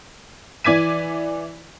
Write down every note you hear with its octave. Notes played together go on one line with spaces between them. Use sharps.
E3 D5 D6 G#6 B6 D#7